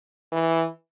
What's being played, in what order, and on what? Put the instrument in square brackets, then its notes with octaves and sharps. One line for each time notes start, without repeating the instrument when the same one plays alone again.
[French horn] E3